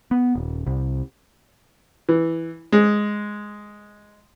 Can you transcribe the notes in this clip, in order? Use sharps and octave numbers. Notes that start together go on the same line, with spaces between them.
B3
D#1
C2
E3
G#3